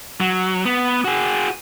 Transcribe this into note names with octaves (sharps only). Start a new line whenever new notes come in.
F#3
B3
F#4 G#4